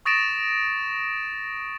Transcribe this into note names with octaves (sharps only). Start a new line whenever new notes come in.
C#6 D#6 A6 A#6 D7 E7